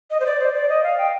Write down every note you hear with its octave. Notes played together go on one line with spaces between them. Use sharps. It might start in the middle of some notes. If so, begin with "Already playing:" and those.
D#5
C5
D5
C5
D5
D#5
F5
G5